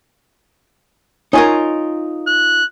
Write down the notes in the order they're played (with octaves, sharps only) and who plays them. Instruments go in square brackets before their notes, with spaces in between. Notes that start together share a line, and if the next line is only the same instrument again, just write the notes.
[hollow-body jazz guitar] D#4 F4 A#4 [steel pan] C#5 G#5
[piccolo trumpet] F#6